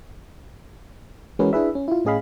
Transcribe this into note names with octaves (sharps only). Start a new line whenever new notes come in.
E3 G#3 C#4 F#4 A#4 B4
D4 E4 G#4 B4 E5
C#4
E4 F4
A2 C#4 G#4 D#5 F5 B5